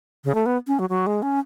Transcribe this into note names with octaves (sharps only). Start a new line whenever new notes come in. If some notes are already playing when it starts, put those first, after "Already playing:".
C#3
A3
B3
C#4
F#3
F#3
G#3
C#4